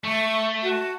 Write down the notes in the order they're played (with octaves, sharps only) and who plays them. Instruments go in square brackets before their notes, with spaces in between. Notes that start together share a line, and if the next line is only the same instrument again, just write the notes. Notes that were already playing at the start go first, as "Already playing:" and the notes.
[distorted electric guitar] A3 [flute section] C#6
[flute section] F#4 A5